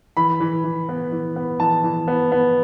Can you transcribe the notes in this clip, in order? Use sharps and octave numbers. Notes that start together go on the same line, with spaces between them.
E3 B5
E3
E3
B3
E3
B3
E3 A5
E3
B3
B3